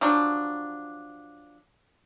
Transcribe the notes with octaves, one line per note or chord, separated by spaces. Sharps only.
F3 F#3 D4